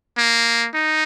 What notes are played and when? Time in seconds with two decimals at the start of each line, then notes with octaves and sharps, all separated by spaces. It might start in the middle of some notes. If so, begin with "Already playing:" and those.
0.18 A#3
0.74 D#4